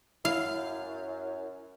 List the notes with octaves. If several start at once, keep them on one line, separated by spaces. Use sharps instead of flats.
F#2 E4 F5